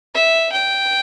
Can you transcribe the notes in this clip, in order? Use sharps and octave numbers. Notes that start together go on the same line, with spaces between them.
E5
G5